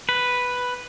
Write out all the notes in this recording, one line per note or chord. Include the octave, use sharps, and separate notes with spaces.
B4